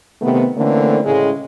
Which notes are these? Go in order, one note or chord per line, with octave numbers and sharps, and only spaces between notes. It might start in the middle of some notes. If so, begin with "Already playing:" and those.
C3 D#3 A3 B3
D3 E3 A3 A#3 C4 C#4
A2 C#3 G#3